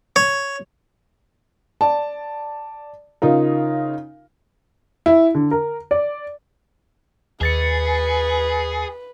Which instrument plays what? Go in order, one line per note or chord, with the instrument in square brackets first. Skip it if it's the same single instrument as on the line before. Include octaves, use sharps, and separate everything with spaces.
[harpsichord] C#5
[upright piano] D5 A5
C#3 D#4 F4 A#4
E4
D3
A#4
D5
[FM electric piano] D#2 A6 C#7 [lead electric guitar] G#4 [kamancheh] B4